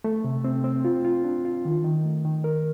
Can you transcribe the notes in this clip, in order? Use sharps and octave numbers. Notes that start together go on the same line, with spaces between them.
A3
C3
C4
C4
F4
F4
D4
F4
D#3
D#3
A3
D#3
A#4